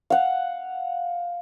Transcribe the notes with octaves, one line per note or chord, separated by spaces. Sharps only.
F5 F#5